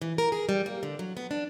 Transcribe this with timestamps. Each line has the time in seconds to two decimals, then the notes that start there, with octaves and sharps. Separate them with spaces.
0.02 E3
0.18 A#4
0.32 G#4
0.49 G3
0.66 A#3
0.83 D3
0.99 F#3
1.17 B3
1.31 D4